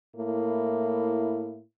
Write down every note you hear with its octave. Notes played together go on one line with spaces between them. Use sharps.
A2 A#3 E4